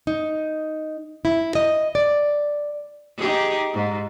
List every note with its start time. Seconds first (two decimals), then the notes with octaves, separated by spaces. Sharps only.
0.07 D#4
1.25 E4
1.55 D#5
1.95 D5
3.17 D#4 G4 G#4
3.74 G#2